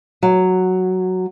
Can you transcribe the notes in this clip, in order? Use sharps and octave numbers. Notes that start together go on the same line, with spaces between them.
F#3